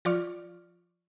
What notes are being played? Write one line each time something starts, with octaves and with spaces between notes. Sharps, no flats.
F3 F4 D5 C#6 F6